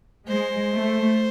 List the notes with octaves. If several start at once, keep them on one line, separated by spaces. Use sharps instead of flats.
G#3 C5
A3